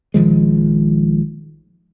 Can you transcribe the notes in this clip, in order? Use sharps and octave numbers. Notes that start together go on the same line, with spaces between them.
A#1 D#3 F3 G#3